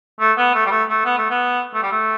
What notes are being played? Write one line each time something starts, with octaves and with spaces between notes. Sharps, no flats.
A3
B3
A3
G3
A3
A3
B3
A3
B3
A3
G3
A3